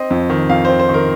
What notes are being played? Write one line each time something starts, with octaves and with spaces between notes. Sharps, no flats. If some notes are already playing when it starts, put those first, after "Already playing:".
Already playing: C4 D#5
F2
D#3
F2 F5
C4 C5
C5
D#3
A#4